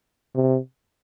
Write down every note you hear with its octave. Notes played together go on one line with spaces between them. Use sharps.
C3